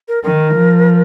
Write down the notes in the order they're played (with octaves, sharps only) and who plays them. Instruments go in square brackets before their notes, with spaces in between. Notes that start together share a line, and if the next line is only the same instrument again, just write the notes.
[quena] A#4
[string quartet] D#3 [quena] A#4
[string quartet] F3